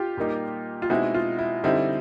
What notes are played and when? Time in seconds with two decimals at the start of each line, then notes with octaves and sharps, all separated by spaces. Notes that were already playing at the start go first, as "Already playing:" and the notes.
Already playing: F4 G4
0.17 A#2 G3 A#3 D#4
0.82 F4
0.90 B2 G#3 C4 D#4 E4 F#4
1.14 F4
1.39 E4
1.64 D3 G3 C4 D#4 E4